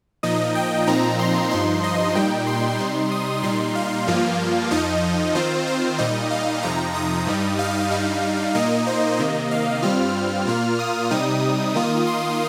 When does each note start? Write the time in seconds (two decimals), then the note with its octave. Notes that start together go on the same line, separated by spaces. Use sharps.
0.23 A#2 F3 D#4 D#5
0.55 G5
0.87 A#2 F3 C4 D#4 A#5
1.19 C6
1.51 G2 F3 D#4 C6
1.83 D#5
2.15 A#2 G3 D#4 G5
2.47 C6
2.79 C3 G3 D#4
3.12 D#6
3.43 A#2 G3 D#4 C6
3.75 F5
4.08 G2 F3 A#3 F4
4.71 F2 F3 D#4 D#5
5.35 D#3 C4 F4 C5
5.67 C5
5.98 A#2 G3 D#4 D#5
6.31 F5
6.63 F2 C3 F3 D#4 A#5
6.95 D#6
7.27 G2 G3 D#4
7.59 F5
7.91 G2 G3 D#4
8.55 A#2 A#3 D#4 D#5
8.87 C5
9.19 C3 D#3 A#3 D#5
9.51 F5
9.82 G2 G3 C4 F4 F6
10.47 A#2 A#3 F4
10.79 D#6
11.11 C3 G3 D#4 D#6
11.75 D#3 A#3 F4
12.07 C6